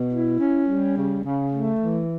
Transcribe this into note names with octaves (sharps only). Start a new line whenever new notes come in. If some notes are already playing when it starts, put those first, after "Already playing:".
Already playing: B2
E4
C#4
G3
C#3
C#3
A3
E3